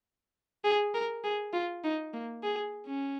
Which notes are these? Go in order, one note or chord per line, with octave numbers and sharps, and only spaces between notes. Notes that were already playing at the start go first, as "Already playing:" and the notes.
G#4
A#4
G#4
F4
D#4
A#3
G#4
C#4